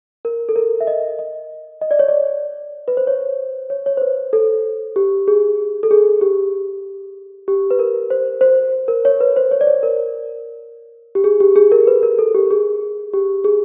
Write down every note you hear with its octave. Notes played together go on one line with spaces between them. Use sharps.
A#4
A4
A#4
E5
D#5
D#5
D#5
D5
C#5
D5
B4
C5
C#5
C#5
C#5
C5
B4
A4
G4
G#4
A4
G#4
G4
G4
B4
A#4
C5
C5
A#4
C#5
B4
C5
C#5
D5
C#5
A#4
G4
G#4
G4
G#4
A#4
B4
A#4
A4
G4
G#4
G4
G#4